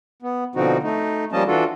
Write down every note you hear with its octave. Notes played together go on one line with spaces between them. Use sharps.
B3
B2 D3 F3 C4 D#4 F#4
A3 D#4
F3 G3 A#3 C#4 D#5 A5
E3 D4 F4 F#4 A4